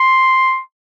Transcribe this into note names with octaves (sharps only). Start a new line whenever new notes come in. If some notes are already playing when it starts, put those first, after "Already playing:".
Already playing: C6